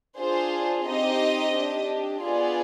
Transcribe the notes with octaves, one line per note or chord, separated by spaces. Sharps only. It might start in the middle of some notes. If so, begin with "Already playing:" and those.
D4 F4 G#4 C5
C4 D#4 G4 D#5
D4 G4
B3 F4 G#4 D5